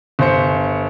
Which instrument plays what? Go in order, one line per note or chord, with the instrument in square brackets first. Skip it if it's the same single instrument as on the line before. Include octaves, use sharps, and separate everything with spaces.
[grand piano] G1 C5 C#7